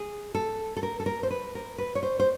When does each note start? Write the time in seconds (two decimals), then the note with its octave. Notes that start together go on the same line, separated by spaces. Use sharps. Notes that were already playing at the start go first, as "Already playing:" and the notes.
Already playing: G#4
0.35 A4
0.77 A4
0.83 A#4
1.00 A4
1.06 A#4
1.23 C5
1.30 B4
1.55 A#4
1.78 B4
1.95 C#5
2.03 C5
2.20 C5